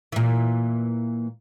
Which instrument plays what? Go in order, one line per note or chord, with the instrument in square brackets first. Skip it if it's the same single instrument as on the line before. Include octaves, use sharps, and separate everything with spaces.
[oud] A#2 E3